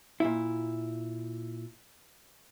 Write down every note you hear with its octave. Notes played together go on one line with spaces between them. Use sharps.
A#2 E4